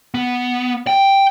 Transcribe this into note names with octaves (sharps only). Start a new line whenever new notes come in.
B3
G5